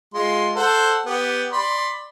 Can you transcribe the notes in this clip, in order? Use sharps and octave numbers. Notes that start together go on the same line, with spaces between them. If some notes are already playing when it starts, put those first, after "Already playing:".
G#3 F4 C6
A4 C5 F#5
B3 G4
D5 B5 C6